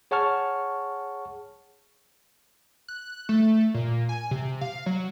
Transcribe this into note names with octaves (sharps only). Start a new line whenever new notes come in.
G#4 C#5 F#5 A5 C#6 F6
F#6
A3
A#2
G#5
C3
F5
F#3